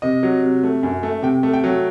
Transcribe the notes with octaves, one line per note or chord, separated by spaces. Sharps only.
C3 D#5
F#3
C3
A3
F#2
A3
C3 G5
A3
G5
F#3